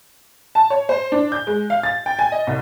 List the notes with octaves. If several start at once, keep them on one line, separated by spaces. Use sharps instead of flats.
A5
C#5
C5
D4
G6
G#3
F5
A6
G5
G#5
D#5
C2